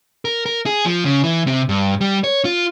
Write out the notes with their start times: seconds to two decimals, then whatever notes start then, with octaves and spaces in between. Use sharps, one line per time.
0.25 A#4
0.46 A#4
0.66 G#4
0.86 F3
1.05 C#3
1.24 E3
1.47 C3
1.69 G2
2.01 G3
2.24 C#5
2.45 F4